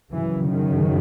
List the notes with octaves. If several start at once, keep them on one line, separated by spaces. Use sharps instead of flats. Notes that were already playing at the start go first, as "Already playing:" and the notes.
F#2 C#3 E3
D#3